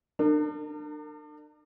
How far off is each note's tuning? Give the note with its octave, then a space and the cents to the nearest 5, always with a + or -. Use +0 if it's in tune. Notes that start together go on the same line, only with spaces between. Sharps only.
D4 +35 A#4 -35